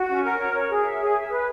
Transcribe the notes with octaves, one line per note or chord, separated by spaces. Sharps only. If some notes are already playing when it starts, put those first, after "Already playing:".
Already playing: F#4
C#4
A#4
C#5
C#5
G#4
E5
G#4
E5
B4